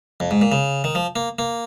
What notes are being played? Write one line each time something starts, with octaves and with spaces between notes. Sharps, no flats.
F2
G#2
A#2
C#3
D#3
F3
A#3
A#3